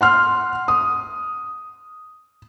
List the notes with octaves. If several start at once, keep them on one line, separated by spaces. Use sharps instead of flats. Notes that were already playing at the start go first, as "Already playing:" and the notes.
F#5 C6 F6
D#6